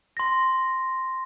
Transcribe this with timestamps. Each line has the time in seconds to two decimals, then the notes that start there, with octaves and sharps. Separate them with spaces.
0.17 C6 A#6